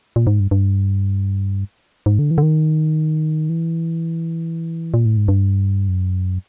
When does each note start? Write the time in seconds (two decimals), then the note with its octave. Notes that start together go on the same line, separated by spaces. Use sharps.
0.16 A#2
0.27 G#2
0.40 G2
0.51 G2
2.06 G#2
2.19 D3
2.31 E3
2.38 D3
2.43 D#3
3.49 E3
4.94 A#2
5.05 A2
5.17 G#2
5.28 G2
5.88 F#2